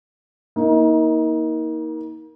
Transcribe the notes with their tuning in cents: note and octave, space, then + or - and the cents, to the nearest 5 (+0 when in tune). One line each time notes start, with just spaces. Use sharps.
A#3 +15 D#4 +35